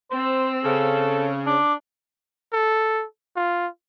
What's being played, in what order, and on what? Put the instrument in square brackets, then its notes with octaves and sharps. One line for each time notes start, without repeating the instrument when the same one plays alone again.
[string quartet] C4 E6 [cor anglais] C5
[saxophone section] C#3 [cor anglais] A4
[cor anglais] D4 [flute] D6
[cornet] A4
F4